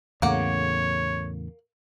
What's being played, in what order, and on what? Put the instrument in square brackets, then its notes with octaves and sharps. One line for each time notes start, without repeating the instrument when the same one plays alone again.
[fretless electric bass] E2 A2 C#3 [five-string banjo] A#3 F#5 [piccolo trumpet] C#5